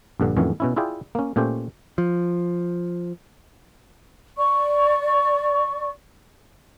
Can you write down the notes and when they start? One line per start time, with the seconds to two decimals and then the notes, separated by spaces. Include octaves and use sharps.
0.20 A#1 G2 D3
0.37 F2 A2 D#3 E3 F#3 C#4
0.60 B2 C#4 E4
0.76 E4 F4 G#4 D5 G5
1.15 A#3 C#4
1.36 A#2 A3 C#4 G4 C5
1.98 F3
4.37 D5 C#6